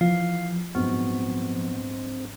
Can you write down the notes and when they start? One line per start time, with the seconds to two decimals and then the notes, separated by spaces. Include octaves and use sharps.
0.01 E3 F3 F5
0.75 A#1 G#2 F#3 B3 C4